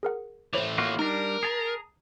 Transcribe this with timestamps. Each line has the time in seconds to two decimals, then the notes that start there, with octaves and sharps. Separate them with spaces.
0.03 G#4 A#4 F#5
0.53 E3 A3 C5 C#5 D6
0.78 A#3 F4 F#4
0.99 G3 D4 D#4 A#4 A#6
1.43 G#4 A5 A#5